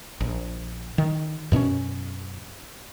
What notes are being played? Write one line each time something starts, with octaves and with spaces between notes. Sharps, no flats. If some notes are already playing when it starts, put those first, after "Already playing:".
A#1
D#3
F#2 B2 B3 C#4